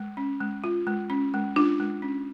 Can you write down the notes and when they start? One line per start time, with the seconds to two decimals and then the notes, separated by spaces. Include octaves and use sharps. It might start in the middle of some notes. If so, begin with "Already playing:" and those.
Already playing: G#3
0.17 C#4
0.41 G#3
0.64 F4
0.87 G#3
1.10 C#4
1.34 G#3
1.56 D4 F4
1.80 G#3
2.02 C#4